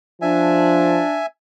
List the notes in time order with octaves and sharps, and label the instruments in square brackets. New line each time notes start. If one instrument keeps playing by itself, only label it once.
[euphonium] F3 [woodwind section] D4 [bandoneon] E5 G#5